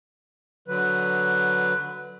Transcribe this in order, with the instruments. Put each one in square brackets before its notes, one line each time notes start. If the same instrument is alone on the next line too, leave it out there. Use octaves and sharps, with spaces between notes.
[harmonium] D3 F#3 B4